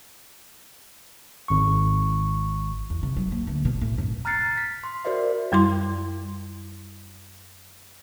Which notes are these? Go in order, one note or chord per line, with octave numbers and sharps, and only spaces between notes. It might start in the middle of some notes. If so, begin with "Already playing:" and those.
G#1 C#6
E2
C3
F#3
A#3
D2
B2
A2
F#2
A#5 F6 F#6 A6 C7 C#7
B6
C6
F#4 A#4 C5 D5 E5
F#2 G3 E4 C6